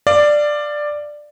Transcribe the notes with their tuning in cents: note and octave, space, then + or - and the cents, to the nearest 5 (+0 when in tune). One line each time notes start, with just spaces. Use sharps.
D5 +10 F5 -25